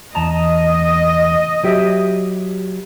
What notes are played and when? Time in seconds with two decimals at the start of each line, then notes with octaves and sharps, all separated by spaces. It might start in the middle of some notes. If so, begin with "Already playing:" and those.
0.15 E2 D#5 A5 A#5
1.64 F#3 G4 E5